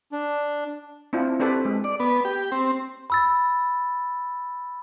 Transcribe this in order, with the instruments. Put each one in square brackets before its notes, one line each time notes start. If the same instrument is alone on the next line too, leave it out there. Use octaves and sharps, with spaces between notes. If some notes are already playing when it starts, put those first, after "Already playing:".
[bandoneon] D4
[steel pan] C4 D4 E4 F4
C4 D4 G4 A4 B4
G#3
[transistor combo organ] D5
B3
G4
C4
[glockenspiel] B5 E6 A6